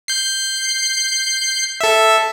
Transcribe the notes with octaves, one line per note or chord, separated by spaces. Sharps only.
G6 C7
A4 E5